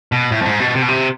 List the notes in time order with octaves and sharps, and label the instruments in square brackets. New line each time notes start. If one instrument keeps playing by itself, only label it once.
[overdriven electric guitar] B2
A2
F2
G#2
B2
C3
B2
C3